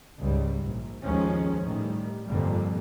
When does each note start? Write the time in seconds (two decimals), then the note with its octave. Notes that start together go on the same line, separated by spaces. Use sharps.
0.21 C#2 G#2 G3
0.64 A#1
1.04 G#1 D#2 D#3 F3 G#3 C#4
1.63 A2 D#3 G3
2.27 G1 F2 A#2 D3 G3 A#3